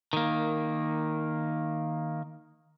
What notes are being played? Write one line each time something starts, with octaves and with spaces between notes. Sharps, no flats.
D#3 A#3